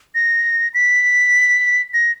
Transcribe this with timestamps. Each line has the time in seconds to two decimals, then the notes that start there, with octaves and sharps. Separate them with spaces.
0.15 A#6
0.74 B6
1.94 A#6